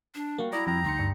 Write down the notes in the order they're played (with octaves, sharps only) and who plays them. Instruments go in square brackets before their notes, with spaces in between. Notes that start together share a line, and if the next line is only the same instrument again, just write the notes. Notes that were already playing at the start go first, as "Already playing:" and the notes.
[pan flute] D4 [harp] C7
[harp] G3 F#4 F5 [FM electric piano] A#3
[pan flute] E4 [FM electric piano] D5 [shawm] A#5 [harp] D#6 E6
[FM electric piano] F2 [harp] G5 [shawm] A#5
[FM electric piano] D2 C6 C#7 [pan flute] D#4
[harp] G2